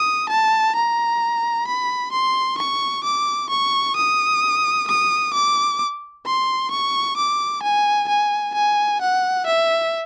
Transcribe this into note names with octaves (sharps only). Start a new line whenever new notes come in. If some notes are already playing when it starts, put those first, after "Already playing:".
Already playing: D#6
A5
A#5
B5
C6
C#6
D6
C#6
D#6
D#6
D6
C6
C#6
D6
G#5
G#5
G#5
F#5
E5